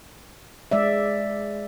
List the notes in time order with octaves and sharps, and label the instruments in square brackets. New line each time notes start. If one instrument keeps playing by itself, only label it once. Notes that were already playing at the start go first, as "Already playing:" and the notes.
[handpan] G#3 D5 E5